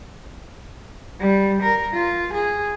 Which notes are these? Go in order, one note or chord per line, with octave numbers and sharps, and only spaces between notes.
G3
A#4
F4
G#4